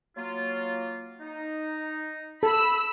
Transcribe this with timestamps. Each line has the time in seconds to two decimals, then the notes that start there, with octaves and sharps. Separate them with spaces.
0.17 F#3 A#3 F4
1.21 D#4
2.43 A4 B5 E6